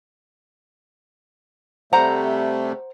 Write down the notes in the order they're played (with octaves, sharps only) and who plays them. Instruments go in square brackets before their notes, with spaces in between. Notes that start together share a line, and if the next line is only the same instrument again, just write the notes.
[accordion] C3 G3 A3 [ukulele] C5 F#5 A#5